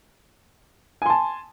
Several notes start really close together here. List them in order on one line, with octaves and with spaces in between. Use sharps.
G#5 C6 A5